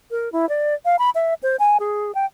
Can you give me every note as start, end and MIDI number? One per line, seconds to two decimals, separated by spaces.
0.11 0.31 70
0.32 0.48 64
0.49 0.74 74
0.85 0.99 77
0.99 1.10 83
1.15 1.34 76
1.43 1.56 72
1.60 1.78 80
1.80 2.14 68
2.15 2.25 79